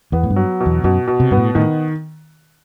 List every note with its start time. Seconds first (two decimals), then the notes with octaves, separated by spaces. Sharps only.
0.12 E2 B3
0.23 A2
0.30 G2
0.36 F#3
0.60 B2
0.66 E2
0.84 F#2 B2
1.07 B2
1.20 C3
1.31 G2 B3
1.37 A2
1.55 A2 D#3